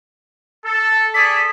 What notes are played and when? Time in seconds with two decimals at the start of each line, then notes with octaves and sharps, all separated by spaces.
0.64 A4
1.14 G#4 A4 D5 B6